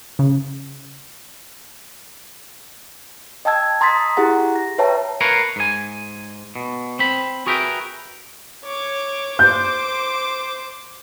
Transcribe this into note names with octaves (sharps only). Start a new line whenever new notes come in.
C#3
D#5 G5 A5 E6 G#6
A#5 C6 D#6 A6 B6
E4 G4 G#4 F#5 A#5
A#6
B4 C#5 E5 G5 A5 A#5
A#4 B4 C#5 F5
G#2 G#5
B2
C4 B5
F#4 G#4 A#4 B4 E5 G5
C#5 D6
C5 D6 G6